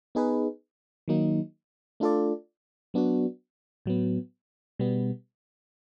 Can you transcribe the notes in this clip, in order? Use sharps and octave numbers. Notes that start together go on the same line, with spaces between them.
B3 D#4 G#4 B4
D#3 F#3 A#3 D#4
A3 D4 F4 A4 D5
F#3 B3 D4 F#4
A2 F#3 B3
B2 G3 B3